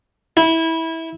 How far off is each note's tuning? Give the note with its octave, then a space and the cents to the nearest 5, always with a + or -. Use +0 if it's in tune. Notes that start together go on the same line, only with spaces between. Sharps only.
E4 -20